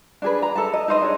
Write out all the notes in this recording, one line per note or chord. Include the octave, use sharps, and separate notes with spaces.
D4 G#4 B4
A#5
A4 E5 A5
D#5
D#4 B4 C5 D#5
D4 G#4 C#5